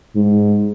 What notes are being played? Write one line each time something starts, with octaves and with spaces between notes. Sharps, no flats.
G#2